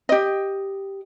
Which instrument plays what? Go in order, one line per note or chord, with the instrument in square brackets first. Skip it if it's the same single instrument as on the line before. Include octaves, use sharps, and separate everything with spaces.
[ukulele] G4 D#5